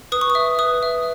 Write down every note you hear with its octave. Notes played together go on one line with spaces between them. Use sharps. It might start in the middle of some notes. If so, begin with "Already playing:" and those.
B4 D#6
C#6
D#6
E5
B4 D#6
E5